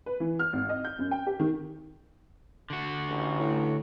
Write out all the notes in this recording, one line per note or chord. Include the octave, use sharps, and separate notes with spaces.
B4
E3
F6
G#1
D#5
G6
F#2
G5
G4
D#3
D3 F#4
A1
A2